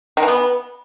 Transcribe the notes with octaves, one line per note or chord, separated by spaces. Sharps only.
D#3
E3
B3